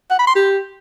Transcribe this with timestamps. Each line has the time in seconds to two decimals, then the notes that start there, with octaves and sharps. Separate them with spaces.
0.11 F#5
0.19 B5
0.27 C6
0.36 G4